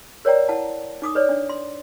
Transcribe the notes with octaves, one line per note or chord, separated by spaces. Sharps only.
A#4 C#5 D5 G5 A#5
E4 F#5 A5
D#4 D6 D#6
B4 C#5 D5
D4
C6